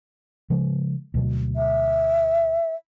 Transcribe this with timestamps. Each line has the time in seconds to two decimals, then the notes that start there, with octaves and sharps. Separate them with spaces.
0.50 C#3 F3 G#3
1.14 D2 B2 F#3
1.56 E5